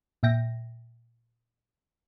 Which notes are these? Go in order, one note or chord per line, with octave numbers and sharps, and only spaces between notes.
A#2 E5 G5 A#6